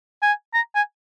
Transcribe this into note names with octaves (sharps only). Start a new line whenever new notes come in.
G#5
A#5
G#5